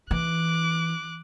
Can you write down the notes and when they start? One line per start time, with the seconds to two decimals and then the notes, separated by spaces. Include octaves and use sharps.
0.11 E3 D6 F#6